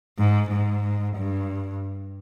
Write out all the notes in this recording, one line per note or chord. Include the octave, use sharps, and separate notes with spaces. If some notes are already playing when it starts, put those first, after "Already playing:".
G#2
G#2
G2